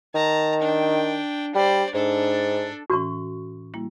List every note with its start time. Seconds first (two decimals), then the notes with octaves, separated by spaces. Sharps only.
0.15 D#3 A5 A#5
0.61 D4 G5
1.55 G3 C5 D5
1.94 G#2 D4 A4
2.90 A2 E3 C#4 F#4 C#6
3.74 G3 A#3 E4